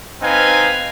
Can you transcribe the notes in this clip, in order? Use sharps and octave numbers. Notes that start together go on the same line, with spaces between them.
C4 D#4 B4 F5 G#5